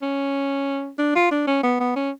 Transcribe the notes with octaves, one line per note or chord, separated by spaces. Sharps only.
C#4
D4
F4
D4
C#4
B3
B3
C#4